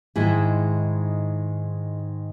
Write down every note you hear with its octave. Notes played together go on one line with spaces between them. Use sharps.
G#2 D#3 G#3 E4 G#4